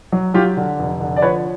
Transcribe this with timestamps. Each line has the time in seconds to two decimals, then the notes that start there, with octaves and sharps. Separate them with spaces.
0.12 F#3
0.34 F#3 F4 G4
0.57 D3
0.79 F1
1.00 D3
1.16 D5
1.22 F3 B4 C#5